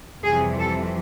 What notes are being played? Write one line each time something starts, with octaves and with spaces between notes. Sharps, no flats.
F2 C3 E3 G3 G#4
A4